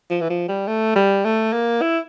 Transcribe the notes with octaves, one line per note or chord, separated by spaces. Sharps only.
F3
E3
F3
G3
A3
G3
A3
A#3
E4